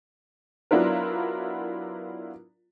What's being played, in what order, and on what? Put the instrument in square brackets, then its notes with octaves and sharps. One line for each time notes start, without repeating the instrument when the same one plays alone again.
[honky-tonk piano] F#3 B3 D4 E4 F4 A#4